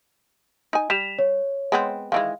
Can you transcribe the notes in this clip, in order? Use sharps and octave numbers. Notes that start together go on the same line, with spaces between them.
D#4 G#5
G3 B6 E7 F7
C#5
G#3 B3 C4
D#3 E3 G#3 F5